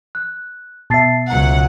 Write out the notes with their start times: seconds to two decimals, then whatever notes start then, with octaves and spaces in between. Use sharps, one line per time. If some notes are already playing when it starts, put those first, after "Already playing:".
0.15 F#6
0.90 B2 E5 A5 A6 C7
1.30 C#2 F#3 F#5 A#5